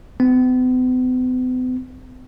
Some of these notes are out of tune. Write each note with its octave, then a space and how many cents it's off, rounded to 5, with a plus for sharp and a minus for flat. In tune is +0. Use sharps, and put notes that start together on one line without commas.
B3 +45